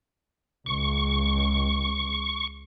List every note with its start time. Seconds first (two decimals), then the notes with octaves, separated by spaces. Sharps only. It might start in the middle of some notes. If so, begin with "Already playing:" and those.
0.66 C#2 C#6